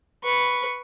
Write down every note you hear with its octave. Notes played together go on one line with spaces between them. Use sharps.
B4 C#6